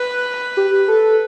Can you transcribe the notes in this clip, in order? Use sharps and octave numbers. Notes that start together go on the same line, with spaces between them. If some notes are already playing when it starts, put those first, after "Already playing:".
Already playing: B4
G4
A4